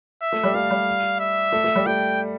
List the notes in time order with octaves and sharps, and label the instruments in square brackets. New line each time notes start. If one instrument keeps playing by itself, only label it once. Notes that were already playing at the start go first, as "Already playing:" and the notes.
[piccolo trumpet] E5
[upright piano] A3
G3
[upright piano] A3 [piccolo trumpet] F5
[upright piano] G3
[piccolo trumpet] E5
[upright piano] A3
A3
G3
[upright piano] A3 [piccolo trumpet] G5